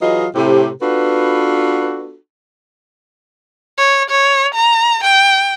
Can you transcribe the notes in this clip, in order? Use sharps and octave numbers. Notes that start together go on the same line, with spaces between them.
E3 F#3 F4 G#4 D#5
A2 C3 G4
B3 D4 F4 F#4 A4 B4
C#5
C#5
A#5
G5